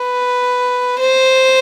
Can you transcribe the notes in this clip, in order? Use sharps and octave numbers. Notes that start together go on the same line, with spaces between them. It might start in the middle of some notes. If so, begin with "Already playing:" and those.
Already playing: B4
C5